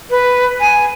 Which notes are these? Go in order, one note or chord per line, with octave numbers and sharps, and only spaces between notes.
B4
G#5